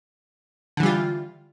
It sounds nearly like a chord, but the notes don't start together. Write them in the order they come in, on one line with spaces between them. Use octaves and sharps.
D3 E3 G3 F4